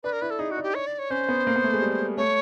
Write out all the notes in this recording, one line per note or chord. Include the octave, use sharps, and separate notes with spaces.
D4 B4
A#4
E4 B4
A4
D#4 G#4
F#4
D4
G4
C#5
D5
C#5
C#4 C5
B3
A#3
B3
A3
G#3
G3
A3 C#5